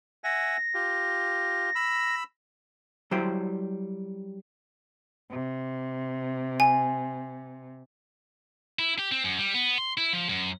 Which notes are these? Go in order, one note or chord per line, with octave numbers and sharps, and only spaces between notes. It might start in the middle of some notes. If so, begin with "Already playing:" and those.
E5 F#5 G#5 A#6
F4 G4
B5 E6
F#3 G3 E4 C5 G5 C6
C3
G#5
E4
G4
C4
F#2
G3
B3
C6
E4
F3
F#2